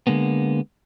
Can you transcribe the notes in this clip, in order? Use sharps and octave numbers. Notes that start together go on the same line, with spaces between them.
D3 G#3 A#3 B3